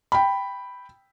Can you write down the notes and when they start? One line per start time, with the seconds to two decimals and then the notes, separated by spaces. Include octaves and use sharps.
0.12 G5 B5